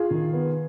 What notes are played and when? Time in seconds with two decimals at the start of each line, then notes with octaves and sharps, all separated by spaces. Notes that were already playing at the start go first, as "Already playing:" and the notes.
Already playing: F4 G#4
0.11 D#3
0.33 B3